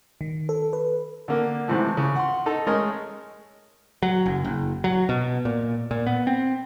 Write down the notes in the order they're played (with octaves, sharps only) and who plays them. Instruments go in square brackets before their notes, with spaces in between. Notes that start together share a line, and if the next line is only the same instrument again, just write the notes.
[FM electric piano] D#3
A4
B4
[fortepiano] D3 A#3
G#2 C3 E3 F3 A3
C#3
F#5 C6
D#4 A4 D#5
G#3 A3 C#4 G#4 A#4 D#5
[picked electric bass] F#3
F#1
F#1
F#3
B2
A#2
A#2
B3
C4